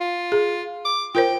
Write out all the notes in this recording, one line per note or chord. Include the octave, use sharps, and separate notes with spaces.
F4
G#4
D6
F4 A#4 C5 G5